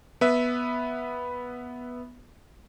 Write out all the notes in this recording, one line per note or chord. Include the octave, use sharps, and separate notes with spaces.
B3 B4 E5